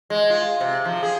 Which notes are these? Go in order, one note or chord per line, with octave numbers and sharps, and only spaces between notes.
G#3
F4
C3
F3
G#4